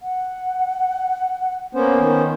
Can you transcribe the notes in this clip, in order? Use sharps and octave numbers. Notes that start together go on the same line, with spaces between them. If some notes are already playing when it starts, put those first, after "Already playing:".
F#5
A#3 B3 C#4 C5
D#3